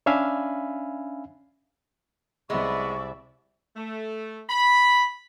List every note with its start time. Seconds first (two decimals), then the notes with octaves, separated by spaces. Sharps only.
0.06 C#4 D4 E5 F5 G#5 B5
2.50 C2 G#3 B3 G#4 D5 E5 B5 C#6
3.76 A3
4.48 B5